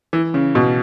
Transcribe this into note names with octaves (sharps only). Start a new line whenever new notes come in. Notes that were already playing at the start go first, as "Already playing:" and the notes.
E3
C#3
B2